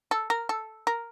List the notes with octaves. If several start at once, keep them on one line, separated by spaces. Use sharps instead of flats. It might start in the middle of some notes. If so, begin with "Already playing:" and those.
A4
A#4
A4
A#4